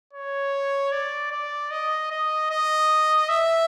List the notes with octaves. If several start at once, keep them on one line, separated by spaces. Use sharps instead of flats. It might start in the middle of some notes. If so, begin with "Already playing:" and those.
C#5
D5
D5
D#5
D#5
D#5
E5